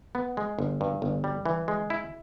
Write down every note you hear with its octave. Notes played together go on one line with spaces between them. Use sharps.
B3
G#3
G1
G2
G1
G3
E3
G#3
E4